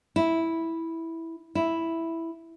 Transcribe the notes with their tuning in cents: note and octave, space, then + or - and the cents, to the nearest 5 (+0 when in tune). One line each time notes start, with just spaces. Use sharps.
E4 -5
E4 +0